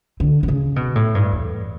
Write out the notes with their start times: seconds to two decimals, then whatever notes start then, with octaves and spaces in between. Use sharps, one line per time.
0.20 D3
0.43 D3
0.48 C#3
0.76 B2
0.95 A2
1.15 G2
1.32 E2